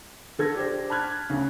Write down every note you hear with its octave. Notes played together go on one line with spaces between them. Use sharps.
D3 A4 G#6 A#6
D4 G4 C5
A5 B5 F6 F#6 G#6
D2 C#3